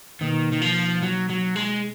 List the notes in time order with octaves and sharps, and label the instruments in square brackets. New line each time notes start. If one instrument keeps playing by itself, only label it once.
[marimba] B2 A#3 D#4 [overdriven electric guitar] D#3
[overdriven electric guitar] D#3
F3
F#3
F#3
G#3